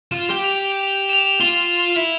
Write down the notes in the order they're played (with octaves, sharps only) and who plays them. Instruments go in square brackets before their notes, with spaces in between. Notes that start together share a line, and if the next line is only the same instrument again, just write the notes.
[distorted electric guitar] F4 [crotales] E7
[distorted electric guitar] G4 [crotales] G7
[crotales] F7
F7
F7
E7
F7
[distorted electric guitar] F4 [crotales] G7
[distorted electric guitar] E4